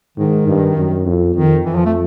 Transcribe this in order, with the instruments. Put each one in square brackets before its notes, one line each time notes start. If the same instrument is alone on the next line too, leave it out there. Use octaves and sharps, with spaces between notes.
[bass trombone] G#2 [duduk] D#3
[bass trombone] G2
F#2
F2
[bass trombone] F2 [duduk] D#3
[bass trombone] F2 [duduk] E3
[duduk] F3
A3